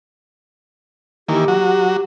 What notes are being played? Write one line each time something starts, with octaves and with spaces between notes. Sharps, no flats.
D#3 E3 A#3 G4
F#3 F#4